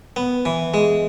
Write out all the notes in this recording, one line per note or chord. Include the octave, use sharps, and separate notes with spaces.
B3
E3
G#3